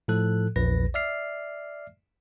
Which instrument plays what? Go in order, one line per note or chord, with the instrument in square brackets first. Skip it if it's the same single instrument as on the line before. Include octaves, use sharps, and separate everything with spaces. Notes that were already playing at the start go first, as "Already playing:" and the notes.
[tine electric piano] A2 F3 A4 F#6
A#1 E2 B4 A#6
D5 E5 F6 C7